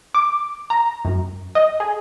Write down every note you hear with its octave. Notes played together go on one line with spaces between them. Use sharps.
D6
A#5
F#2
D#5
G#4